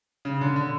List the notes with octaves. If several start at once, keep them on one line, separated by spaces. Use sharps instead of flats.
C#3
D3
D3